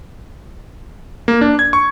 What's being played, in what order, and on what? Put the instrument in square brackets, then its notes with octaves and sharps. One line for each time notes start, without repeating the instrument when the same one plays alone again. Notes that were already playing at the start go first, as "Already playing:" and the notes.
[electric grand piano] A#3
D4
G#6
C#6